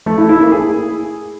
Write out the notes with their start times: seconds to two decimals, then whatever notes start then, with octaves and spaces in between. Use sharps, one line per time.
0.06 A3
0.18 E4
0.29 E4
0.41 A#3
0.52 G#4